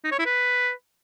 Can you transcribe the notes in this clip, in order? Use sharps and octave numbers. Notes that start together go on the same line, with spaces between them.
D#4
C#5
E4
B4